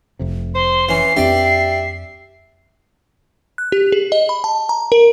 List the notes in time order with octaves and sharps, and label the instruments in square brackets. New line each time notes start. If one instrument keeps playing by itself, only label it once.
[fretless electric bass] F1 F2 C3
[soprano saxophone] C5 [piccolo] C6
[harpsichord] E3 C#4 [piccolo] C7
[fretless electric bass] F2 C4 D4 [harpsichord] G4 D5 [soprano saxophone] E5
[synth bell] F#6
G4
G#4
D#5
B5
A5
A#5
A#4